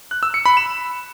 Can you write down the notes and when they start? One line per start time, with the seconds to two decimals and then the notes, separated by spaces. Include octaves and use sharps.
0.11 F#6
0.23 E6
0.34 C#7
0.46 B5
0.57 E7